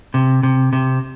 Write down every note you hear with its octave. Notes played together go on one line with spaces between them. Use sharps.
C3
C3
C3